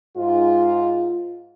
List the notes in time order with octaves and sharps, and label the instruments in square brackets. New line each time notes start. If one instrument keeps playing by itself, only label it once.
[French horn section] G#2 F4